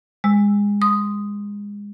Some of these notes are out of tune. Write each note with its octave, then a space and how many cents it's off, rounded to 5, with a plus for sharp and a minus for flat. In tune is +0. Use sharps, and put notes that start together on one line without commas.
G#3 -25 E6 -5
C6 -10 D#6 +0